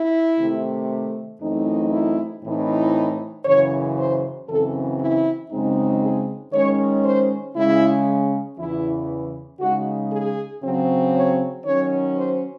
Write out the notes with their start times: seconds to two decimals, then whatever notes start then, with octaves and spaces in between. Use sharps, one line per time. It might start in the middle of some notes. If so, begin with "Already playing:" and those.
Already playing: E4
0.38 C3 D#3 A3
1.40 F#2 E3 A3 C4 D#4
1.92 E4
2.42 A2 E3 C4 D#4
3.45 F#2 C#3 E3 C#5
3.97 C5
4.47 F#2 C#3 E3 C4 A4
4.99 E4
5.50 F#2 C#3 G#3 C4 D#4
6.01 G#4
6.52 D#3 G#3 C#4 C#5
7.04 C5
7.54 C#3 G#3 C#4 E4
8.58 E2 C#3 E3 E4
9.60 C#3 G#3 D#4 F#4
10.11 G#4
10.63 C#3 F#3 C4
11.14 C#5
11.65 D#3 F#3 C#4 C#5
12.16 C5